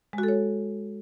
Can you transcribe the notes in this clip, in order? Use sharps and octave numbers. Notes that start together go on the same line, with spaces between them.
G#3
F#4
A4
C#5